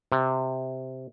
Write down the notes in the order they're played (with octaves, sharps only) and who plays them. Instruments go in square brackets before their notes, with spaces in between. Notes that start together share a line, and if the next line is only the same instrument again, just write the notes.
[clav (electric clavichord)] C3